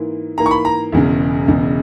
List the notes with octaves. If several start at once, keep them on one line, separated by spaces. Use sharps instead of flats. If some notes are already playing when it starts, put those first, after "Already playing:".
Already playing: G#2 E3 A#3
G#2 E3 A#3 A#5
C#6
B5
A#5
E1 E2 C#3
E1 E2 C#3